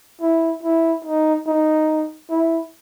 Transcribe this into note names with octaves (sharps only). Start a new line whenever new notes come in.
E4
E4
D#4
D#4
E4